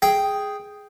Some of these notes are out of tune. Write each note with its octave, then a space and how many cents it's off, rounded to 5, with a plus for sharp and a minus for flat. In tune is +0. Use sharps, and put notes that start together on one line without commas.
G#4 +0 G5 +0